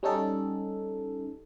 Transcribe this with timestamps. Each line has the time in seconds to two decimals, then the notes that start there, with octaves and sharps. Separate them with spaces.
0.03 G3 C#4 D#4 A4